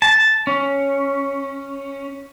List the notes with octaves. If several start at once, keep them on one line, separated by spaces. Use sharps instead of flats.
A5
C#4